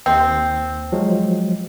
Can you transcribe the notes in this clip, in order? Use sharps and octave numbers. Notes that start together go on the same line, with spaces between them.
D#2 C4
F3 F#3 G#3